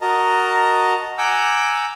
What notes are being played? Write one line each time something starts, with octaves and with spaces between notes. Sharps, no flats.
F#4 A#4 D#5 A5 A#5
F#5 G#5 A#5 D6 E6 G6